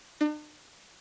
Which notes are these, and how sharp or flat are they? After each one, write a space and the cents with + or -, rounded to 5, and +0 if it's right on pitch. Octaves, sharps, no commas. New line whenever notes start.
D4 +45